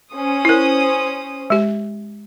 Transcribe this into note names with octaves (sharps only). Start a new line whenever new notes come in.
C#4 C5 D#6
E4 A#4
G#3 G4